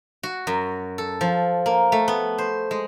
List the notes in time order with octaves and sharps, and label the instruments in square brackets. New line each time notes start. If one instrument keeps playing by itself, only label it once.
[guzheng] F#4
F#2
A4
F3
A#3
A3
B3
C5
G#3